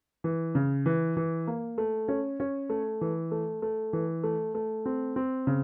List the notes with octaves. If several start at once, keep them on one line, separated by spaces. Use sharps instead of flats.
E3
C#3
E3
E3
A#3
A3
C#4
C#4
A3
E3
A3
A3
E3
A3
A3
C4
C4
C#3